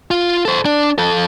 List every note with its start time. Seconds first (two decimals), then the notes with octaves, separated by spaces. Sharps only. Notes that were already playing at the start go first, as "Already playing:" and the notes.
0.11 F4
0.45 A4 C5
0.65 D4
0.98 F3 A4